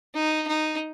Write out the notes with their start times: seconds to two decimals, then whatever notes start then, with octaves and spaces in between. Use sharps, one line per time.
0.14 D#4
0.47 D#4